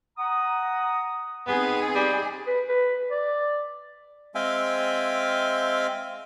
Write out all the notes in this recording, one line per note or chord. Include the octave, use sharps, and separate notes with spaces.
F#5 A#5 D#6
B3 C4 D#4 G#4
G3
B4
B4
D5
G#3 C4 E5 F5 G5 G#5